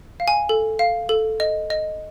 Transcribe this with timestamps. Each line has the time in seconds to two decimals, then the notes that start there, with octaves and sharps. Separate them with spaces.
0.20 F5
0.28 G#5
0.49 A4
0.79 F5
1.09 A4
1.40 D#5
1.70 D#5